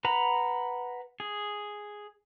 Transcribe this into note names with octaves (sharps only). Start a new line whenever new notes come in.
B4 F#5 A#5 B5
G#4